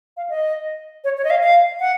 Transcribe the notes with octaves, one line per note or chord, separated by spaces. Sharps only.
F5
D#5
C#5
C#5
D#5
F5
F5
F#5